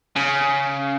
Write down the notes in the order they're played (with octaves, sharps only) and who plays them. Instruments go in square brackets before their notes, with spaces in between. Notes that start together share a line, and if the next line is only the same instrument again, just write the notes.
[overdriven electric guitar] C#3